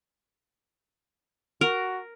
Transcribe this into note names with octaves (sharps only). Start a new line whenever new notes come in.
F#4 A#4